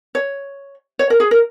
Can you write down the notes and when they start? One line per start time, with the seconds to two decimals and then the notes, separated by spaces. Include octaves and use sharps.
0.15 C#5
0.99 C#5
1.10 A#4
1.20 G#4
1.31 A#4